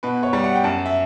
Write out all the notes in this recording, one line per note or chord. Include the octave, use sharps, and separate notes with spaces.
B2 B4
C#5
G3
F#5
G5
F#2 A5
E5